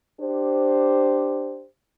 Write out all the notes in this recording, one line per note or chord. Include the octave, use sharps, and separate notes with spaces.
D4 G4 C5